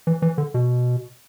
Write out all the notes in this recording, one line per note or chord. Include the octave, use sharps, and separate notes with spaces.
E3
E3
D3
B2